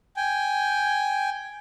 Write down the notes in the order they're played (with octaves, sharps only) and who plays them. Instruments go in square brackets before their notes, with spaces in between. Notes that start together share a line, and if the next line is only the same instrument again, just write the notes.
[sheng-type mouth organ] G5 G#5